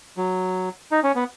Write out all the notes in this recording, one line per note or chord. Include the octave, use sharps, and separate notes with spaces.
F#3
D#4
C#4
B3